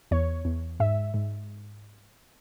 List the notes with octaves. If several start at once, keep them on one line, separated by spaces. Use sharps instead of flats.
E2 C#5
E2
G#2 E5
G#2